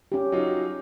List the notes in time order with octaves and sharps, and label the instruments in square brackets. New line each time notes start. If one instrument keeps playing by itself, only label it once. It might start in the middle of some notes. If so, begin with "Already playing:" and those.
[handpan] C#4 G4
[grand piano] F#3 D#4 F4